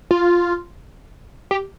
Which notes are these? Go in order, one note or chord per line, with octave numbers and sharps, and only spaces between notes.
F4
G4